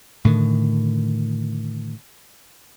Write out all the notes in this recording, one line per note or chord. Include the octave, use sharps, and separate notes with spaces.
A2 D3 D#3